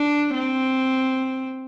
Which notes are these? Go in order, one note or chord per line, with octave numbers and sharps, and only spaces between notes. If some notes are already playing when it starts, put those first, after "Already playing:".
Already playing: D4
C4